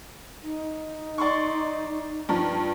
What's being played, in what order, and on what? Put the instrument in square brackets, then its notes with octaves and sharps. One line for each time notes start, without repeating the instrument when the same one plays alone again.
[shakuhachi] D#4
[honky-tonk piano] D5 C6 C#6
G2 F3